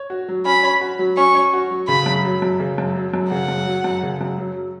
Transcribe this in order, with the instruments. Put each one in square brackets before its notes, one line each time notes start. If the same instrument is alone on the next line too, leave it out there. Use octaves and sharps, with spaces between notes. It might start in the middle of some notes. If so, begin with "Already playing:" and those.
Already playing: [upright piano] C#5
F#4
F#3
[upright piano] C#4 [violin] B5
[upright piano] C#5
F#4
F#3
[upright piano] C#4 [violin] C#6
[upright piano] C#5
F#4
F#3
[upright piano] C#3 [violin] B5
[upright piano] F#2
F#3
F#2
C#3
F#2
F#3
F#2
[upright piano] C#3 [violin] F#5
[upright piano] F#2
F#3
F#2
C#3
F#2
F#3